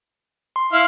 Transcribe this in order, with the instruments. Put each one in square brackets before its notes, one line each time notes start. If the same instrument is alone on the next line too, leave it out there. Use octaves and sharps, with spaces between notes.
[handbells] C6
[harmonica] E4 F5